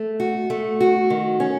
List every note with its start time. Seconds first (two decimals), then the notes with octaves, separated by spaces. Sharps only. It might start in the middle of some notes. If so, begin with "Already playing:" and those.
Already playing: A3
0.20 F#4
0.50 A3
0.81 F#4
1.10 D#3
1.40 C#4